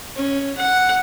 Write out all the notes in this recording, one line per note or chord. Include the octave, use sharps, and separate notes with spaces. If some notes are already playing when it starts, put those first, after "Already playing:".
C#4
F#5